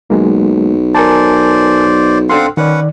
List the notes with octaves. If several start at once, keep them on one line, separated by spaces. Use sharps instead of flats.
B1 F#3 G#3 A#3
A#4 C5 D5 G#5 A5
C4 D4 A4 F5 F#5 C6
D#3 C#4 B4 D5 F#5